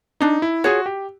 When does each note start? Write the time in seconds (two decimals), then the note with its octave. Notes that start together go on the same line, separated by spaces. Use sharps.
0.21 D4 D#4
0.42 E4
0.64 F4 F#4 G#4 C#5
0.86 G4